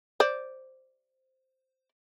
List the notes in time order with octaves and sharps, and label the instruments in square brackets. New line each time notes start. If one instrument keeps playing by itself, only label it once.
[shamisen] C5 D5